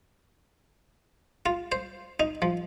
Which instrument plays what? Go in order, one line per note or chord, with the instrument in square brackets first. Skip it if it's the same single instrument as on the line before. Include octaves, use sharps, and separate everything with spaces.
[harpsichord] F4
C5
D#4
F3